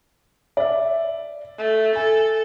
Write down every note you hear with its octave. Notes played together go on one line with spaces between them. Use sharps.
D5 E5
A3
A4 G#5